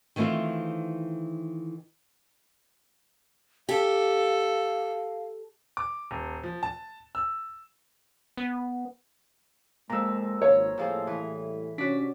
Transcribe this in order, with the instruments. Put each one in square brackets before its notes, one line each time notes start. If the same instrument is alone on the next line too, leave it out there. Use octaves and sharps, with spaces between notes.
[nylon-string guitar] D#3 E3 A3 C4 F4
[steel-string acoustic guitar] G4 [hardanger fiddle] A4 [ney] F5
[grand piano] D6
D#1
F3
A5
E6
[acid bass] B3
[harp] F2 A#2 [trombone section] G#3 [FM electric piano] A#5 E6
[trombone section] G#1 [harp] F4 [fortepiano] C#5
[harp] F2 F3 G#4 [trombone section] A2 G3 A3
[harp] E3
[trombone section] C3 C#4 [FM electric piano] D4 B6 [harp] F#4 D5